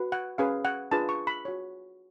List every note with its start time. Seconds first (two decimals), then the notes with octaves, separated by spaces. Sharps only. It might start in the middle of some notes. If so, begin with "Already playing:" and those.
Already playing: F#4 B4
0.12 F#5
0.38 C#4 G#4 B4 F5
0.65 F#5
0.91 D4 F4 G#4 B4 A5
1.09 C#6
1.27 B5
1.45 F#4 C#5